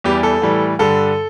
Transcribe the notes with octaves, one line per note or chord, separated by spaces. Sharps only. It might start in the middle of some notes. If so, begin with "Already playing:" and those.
E2 E3 G3 G4
A4
A2 E3 G3
G2 D3 G3 A4